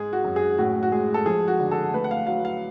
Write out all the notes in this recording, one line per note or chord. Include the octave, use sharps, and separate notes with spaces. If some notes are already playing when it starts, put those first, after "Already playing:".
Already playing: G#2 G#3 G#4
F#4
F#2
G#4
A2 F#4
F#4
G#3 G#4
A4
F3 G#4
F#4
D3
A4
A3 B4
F#5
F5
F#3 F5
F5